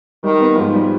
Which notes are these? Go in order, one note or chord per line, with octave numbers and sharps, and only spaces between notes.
D#3 G3
B3
G#2 F3
G3